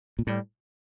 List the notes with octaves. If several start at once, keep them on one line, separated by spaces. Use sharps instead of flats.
A#2
A2 G3